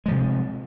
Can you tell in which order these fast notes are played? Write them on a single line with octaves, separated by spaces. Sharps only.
G#3 F3 C3